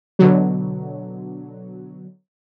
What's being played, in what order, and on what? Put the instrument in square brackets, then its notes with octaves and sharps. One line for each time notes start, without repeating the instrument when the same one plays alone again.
[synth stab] B2 D3 F#3